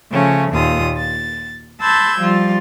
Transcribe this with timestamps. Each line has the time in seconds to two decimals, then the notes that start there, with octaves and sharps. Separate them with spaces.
0.12 C#3 F3 A3 C#4
0.51 D#2 A#2 F4 D#6
0.96 A6
1.81 A5 B5 C6 E6 G6 G#6
2.19 F3 G3 F4